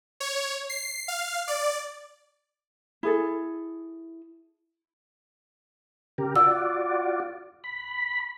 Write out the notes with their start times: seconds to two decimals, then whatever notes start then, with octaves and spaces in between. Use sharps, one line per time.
0.20 C#5
0.69 C7
1.08 F5
1.48 D5
3.03 E4 G#4 A4
6.18 C#3 G4 A#4
6.36 F4 F#4 D5 E6
7.64 B5